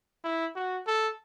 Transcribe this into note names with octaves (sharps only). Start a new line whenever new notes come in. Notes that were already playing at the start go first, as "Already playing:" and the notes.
E4
F#4
A4